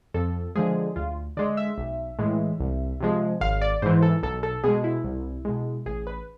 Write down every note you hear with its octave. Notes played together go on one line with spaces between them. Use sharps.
F2 A4
D3 F3 G#3 G#4
D2 F4
D3 G#3 D5
E5
B1
A2 E3 G#3
C2
C3 F3 G#3
G#1 F5
D5
G#2 E3 C5
A4
B1 A4
A4
B2 G#3 G#4
E4
C2
B2 G#3
A1 G#4
B4